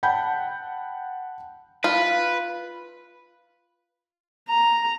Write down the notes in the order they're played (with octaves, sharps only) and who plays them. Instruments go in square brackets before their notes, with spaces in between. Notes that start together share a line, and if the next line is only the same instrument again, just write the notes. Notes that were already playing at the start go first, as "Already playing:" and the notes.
[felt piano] F#5 G5 A5 B5 G6
[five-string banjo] F4 [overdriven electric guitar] B4
[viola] A#5